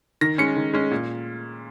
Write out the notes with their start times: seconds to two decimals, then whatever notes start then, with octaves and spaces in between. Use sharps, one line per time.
0.21 D#3 A#6
0.38 G#3 C#4 C#7
0.56 D#3
0.73 G#3 C#4
0.91 A#2